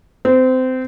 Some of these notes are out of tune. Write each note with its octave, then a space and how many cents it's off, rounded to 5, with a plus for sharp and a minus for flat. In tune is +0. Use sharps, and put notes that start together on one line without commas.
C4 -25